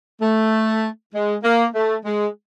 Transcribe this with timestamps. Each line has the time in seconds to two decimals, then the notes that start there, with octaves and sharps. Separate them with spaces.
0.20 A3
1.13 G#3
1.44 A#3
1.74 A3
2.05 G#3